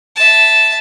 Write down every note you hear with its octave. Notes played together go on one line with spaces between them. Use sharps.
E5 A5